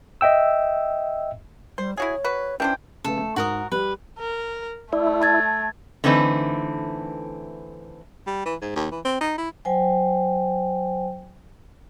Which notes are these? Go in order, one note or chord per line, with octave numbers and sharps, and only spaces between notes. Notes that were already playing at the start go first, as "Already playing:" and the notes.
D#5 E5 G5 E6
G3 C5
E4 F#4 G#4 C#5
F#4 B4
E3 C#4 D4 C5 G5
C#3 A3 A4 B4
A3
G#2 F#4 A#4 D#6
G3 G4 B4
A#4
A3 E4 D5
A5 G#6 A6
D3 E3 A3 C4 D#4 B4
G3
E3
G#2
D#2
E3
C4
D#4
E4
F#3 C5 G5 G#5